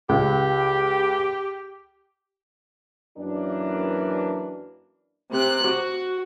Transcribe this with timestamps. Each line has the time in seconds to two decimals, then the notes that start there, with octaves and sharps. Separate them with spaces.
0.09 C#2 G4
3.17 F#2 E3 A#3 D4
5.31 C3 F#6
5.67 F#4